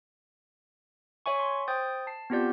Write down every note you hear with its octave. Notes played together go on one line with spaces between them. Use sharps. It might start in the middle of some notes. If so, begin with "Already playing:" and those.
C#5 E5 G#5 C#6
C6
C5 G5 D#6 G6 A6
A5 C7
B3 C4 F4 G4 D5 G6